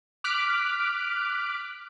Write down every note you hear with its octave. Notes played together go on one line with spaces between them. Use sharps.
D6 F6 F#6 B6 D7